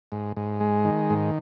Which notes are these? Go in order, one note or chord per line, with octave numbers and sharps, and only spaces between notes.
G#2
G#2
G#3
D#3
G#2